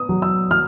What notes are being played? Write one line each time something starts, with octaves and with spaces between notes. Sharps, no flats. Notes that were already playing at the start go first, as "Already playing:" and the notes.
Already playing: B3 D#6
F#3
E6
F#3 F6